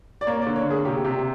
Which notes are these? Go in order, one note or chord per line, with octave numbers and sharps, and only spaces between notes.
D5
A#3 C#5
D5
D3
C#5
A#3 G#4
C3 G4
C3 G4